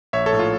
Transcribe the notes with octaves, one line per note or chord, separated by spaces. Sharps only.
A#1 C#5 E5
A4 C#5
A2
F4